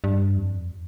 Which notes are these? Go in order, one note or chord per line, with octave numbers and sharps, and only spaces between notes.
G2
F2